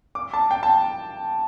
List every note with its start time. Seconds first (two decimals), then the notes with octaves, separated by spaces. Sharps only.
0.15 D6
0.34 A5
0.51 G5
0.63 A5